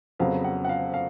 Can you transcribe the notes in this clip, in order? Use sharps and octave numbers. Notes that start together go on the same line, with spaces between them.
F2 C#3 F#3 B3 F5
F#5
F#5
F5
F5